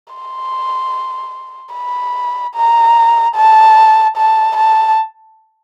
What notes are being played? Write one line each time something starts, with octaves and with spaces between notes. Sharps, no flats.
C6
B5
A#5
A5
A5
A5